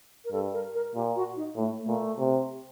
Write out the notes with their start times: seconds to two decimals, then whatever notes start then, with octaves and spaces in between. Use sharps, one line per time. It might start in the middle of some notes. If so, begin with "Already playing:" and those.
0.24 A#4
0.32 G2 A4
0.53 A#4
0.74 A#4
0.95 A#2 G4
1.16 F#4
1.36 D#4
1.56 A2 A3
1.82 A3
1.87 A#2
2.19 C3